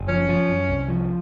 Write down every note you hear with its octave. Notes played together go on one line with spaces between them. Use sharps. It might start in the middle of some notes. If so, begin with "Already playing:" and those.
Already playing: F#1
F3 C#4
F3
F#2
C2
F3